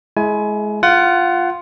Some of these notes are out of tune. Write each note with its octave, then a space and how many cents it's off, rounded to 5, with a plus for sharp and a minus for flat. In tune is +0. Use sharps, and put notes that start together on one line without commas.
G#3 +25 E4 +0 G#5 +25
F4 +0 F#5 +20